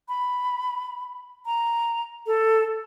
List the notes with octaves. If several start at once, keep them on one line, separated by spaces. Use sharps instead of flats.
B5
A#5
A4